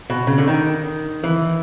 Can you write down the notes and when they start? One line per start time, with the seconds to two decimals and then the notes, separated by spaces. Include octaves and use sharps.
0.10 B2
0.27 C#3
0.38 D3
0.48 D#3
1.24 E3